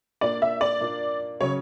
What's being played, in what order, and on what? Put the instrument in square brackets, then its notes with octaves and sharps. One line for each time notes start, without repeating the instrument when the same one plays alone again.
[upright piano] A#2 A#3 D4 [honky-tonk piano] D5
[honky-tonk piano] E5
D5
[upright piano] A#2 A#3 D4
[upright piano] C#3 F#3 C#4 [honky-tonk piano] C#5